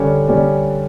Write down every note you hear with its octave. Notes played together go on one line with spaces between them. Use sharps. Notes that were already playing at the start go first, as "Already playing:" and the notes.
Already playing: D3 G3 C#4
D3 G3 C#4